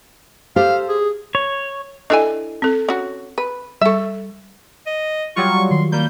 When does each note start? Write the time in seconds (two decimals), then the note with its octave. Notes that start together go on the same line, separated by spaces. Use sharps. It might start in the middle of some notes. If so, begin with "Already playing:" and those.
0.56 G4 A4 C5 F5
0.89 G#4
1.35 C#5
2.10 D4 E4 A4 D#5 G#5
2.62 C4 A4
2.89 C#4 F#4
3.38 B4
3.81 G3 A4 E5 C#6
4.87 D#5
5.36 F#3 G3 F4 C#6
5.71 D#3 C6
5.92 G3 A#3 G6